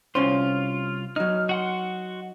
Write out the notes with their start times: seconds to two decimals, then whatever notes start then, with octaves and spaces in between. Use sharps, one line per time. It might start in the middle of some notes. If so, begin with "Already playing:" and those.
0.15 C2 C#4 F4 C5
1.16 F#3 D#4 F6
1.49 F#4 F#5 C6